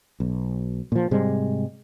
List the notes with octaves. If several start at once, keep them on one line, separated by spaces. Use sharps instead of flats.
B1
A#2 F3
G#2 C3 G3 G#3